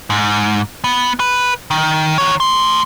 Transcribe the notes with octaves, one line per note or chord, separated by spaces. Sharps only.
G#2
B3
B4
D#3
D#3 C#5
A3 C6